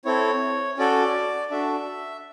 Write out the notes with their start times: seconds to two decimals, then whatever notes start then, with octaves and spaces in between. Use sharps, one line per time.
0.05 C4 E4 A4 C#5
0.78 C#4 F#4 A4 D5
1.50 D4 F#4 A4 E5